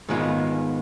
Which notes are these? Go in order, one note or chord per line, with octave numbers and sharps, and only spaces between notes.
G#2 D#3 G#3 B3 F4